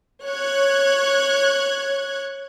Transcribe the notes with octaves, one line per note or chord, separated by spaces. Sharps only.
C#5 F#6 G#6